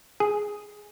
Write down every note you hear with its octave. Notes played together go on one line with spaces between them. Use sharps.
G#4